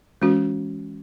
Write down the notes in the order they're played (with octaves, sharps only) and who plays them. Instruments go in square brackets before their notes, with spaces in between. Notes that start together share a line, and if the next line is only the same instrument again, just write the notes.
[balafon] E3 G#3 C#4 F#4